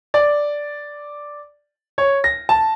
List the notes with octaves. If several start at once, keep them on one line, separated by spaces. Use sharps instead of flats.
D5
C#5
A#6
A5